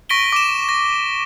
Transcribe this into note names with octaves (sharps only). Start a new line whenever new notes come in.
C#6 A#6 B6 D7 D#7 G7
D6 E7
A#6